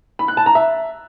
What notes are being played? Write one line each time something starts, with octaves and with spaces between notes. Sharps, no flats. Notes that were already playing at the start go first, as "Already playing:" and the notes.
B5
F#6
A5
A#5
E5